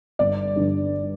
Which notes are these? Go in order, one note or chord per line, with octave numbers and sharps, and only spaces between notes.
G1 D5
G2 D3